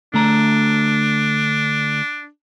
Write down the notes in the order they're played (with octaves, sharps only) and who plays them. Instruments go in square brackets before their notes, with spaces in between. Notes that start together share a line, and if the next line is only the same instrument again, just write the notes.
[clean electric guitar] D3 A3 A#5 [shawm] D4